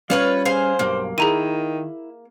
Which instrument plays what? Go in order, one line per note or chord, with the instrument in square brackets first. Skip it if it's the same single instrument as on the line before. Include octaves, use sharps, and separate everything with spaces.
[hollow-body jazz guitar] G3 C#4 [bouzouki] F4 B4 C#5 [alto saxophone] F5
[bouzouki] G#4 F5 G#5 [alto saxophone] C5 [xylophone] C7
[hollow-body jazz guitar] B1 G2 [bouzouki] A#3
[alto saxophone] D#3 [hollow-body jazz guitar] E4 [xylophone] G#4 A#5 D#7